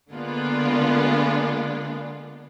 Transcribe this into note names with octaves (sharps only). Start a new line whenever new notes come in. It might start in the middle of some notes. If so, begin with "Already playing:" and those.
D3 G#3 A#3 B3 F4 D5